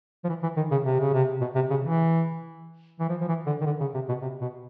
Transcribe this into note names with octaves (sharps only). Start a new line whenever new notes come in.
F3
E3
E3
D#3
C#3
C3
C#3
C3
B2
C3
C#3
E3
E3
F3
F3
E3
D3
D#3
D3
C#3
C3
B2
C3
B2